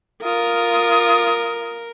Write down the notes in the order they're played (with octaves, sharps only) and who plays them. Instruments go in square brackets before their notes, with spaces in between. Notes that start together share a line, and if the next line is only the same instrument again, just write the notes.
[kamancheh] F4 D#6 [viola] A#4